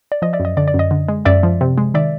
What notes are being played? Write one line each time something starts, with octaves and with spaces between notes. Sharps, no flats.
D5
F3 D#5
D5 E5
F#2
D#5
D3 D5
D5
F#2 D#5
D3
G#3
F#2 D5 E5
F3
C3
G#3
D#3 D5 E5